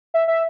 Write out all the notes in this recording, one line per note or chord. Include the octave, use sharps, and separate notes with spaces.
E5
E5